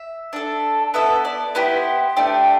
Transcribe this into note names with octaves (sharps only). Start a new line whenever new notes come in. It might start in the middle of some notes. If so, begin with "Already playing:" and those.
Already playing: E5
D4 A4
B3 E4 A4 E5
D5
B3 E4 G4 C5
A3 D4 G4